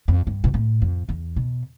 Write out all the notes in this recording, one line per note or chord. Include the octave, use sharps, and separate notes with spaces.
F2
G2
B2
A2
F2
E2
B2